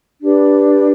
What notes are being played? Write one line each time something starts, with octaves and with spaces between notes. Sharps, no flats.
D4 G4 B4